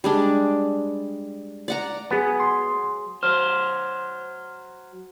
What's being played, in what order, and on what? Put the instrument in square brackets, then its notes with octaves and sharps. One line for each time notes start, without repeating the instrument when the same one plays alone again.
[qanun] G3 G#3 D4
D5 F#5 A#5
[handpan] F#3 G#4 [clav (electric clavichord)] B3
[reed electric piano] C6
[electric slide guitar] F#3 C5 [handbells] F6